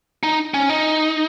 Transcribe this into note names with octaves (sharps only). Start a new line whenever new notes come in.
D#4
C#4
D#4